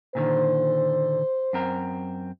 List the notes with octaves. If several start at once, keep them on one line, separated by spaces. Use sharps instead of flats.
A#2 D3 D#3 C5
F#2 C4 A#4